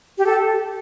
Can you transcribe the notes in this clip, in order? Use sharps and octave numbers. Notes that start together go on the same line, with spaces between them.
G4
A4